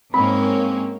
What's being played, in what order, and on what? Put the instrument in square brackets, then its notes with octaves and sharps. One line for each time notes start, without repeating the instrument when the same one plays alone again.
[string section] G#2 A#3 C#4 [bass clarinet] C4 [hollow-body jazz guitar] B5